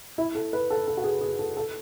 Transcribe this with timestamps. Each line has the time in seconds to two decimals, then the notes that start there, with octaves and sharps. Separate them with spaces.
0.18 E4
0.35 A4
0.53 B4
0.70 A4
0.88 A4
0.97 F#4
1.04 G#4
1.21 G#4
1.39 A4
1.57 A4